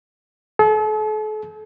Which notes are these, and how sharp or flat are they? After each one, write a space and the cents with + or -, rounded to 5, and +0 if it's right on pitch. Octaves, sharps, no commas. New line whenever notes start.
A4 -40